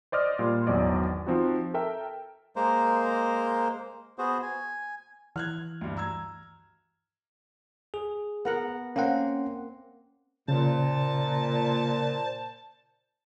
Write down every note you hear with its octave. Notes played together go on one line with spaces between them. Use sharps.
C5 D5 D#5 F6
A#2 G3 C6
G#1 E2 F#3 D5 D#5
F3 C4 D#4 F#4
A4 A#4 E5 G5
G#3 A#3 A#4 C5
B3 F#4 G#4 C5
G#5
E3 F6 F#6 G#6
D2 G2
A#5 E6 G#6
G#4
B3 A#4 F#5
A#3 C4 C#4 F#5
A#2 C#3 C5 D5 A5